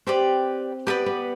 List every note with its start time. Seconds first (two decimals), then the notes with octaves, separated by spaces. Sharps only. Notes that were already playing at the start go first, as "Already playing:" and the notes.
0.07 C4 G4 B4 D5
0.87 B3 G4 B4 D5
1.06 B3